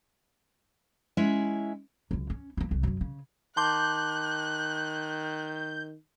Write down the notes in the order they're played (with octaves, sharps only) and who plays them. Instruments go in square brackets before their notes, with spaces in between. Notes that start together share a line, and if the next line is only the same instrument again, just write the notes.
[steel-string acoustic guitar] G#3 C#4 E4 E5
[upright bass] C#2 F#2
C#4
A#3 E4
C2 C#3
F#2 D3
C#3
[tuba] D#3 [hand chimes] A5 C6 D6 [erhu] F#6 [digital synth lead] G6